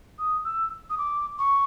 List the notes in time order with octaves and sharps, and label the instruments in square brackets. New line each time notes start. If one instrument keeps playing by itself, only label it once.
[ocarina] D#6
E6
D#6
D6
C#6